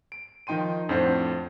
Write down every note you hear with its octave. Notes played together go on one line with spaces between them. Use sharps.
D7
D#3 F3 D#4 G5 C6 D#7
F2 A2 C4 D4 C5 F#5